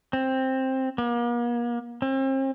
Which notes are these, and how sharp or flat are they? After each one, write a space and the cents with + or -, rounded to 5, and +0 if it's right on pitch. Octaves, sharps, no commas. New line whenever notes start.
C4 +10
A#3 +40
C4 +40